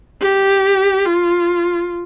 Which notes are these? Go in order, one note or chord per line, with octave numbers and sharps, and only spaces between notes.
G4
F4